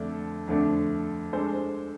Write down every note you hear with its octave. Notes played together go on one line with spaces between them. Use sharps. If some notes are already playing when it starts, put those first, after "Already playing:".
Already playing: F2 D3 A3 D4
F2 D3 A3 D4
G#3 D4 A4 C5